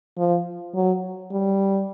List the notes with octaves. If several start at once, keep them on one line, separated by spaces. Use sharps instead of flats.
F3
F#3
G3